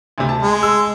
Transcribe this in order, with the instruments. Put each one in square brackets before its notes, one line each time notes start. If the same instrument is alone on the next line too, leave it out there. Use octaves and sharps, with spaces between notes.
[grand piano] D2 C3
A5
[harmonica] G#3
[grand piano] E6